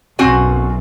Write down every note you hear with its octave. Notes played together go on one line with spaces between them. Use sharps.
B1 F#2 C4 F#4 G#5